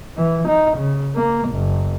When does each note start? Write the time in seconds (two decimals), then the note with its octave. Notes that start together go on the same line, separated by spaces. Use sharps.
0.17 E3
0.48 D#4
0.78 C#3
1.16 A#3
1.50 F#1